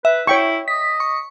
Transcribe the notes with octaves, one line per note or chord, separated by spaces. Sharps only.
B4 E5
E4 C#5 G5 C#6
D#5 B6
C#6